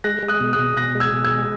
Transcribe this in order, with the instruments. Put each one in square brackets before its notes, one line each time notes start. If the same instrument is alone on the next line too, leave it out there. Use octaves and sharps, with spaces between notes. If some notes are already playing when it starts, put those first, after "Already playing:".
[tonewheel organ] G#3 [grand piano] F#6 A#6
[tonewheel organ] G#3
[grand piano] D#6 F#6
[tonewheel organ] B2
[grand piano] D#6 F#6
[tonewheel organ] B2
[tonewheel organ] B2 [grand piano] F#6 A#6
[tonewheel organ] G#3
[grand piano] E6 G#6
[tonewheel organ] B2
[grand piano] E6 G#6
[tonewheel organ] G#3